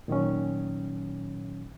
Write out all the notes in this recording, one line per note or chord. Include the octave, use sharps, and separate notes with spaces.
A#2 D#3 F#3 C#4